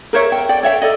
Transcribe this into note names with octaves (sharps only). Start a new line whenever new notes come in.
A#4 C5 C#5 E5
G5
D5 G5
C#5 E5 F#5 G5
A4 D5 D#5